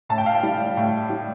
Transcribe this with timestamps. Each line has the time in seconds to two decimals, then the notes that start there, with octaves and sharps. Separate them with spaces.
0.09 A2 A5
0.18 G5
0.26 F5
0.35 G5
0.43 G3
0.77 A2
1.10 G3